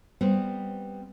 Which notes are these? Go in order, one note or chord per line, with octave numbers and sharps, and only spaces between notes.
G3 B3 C4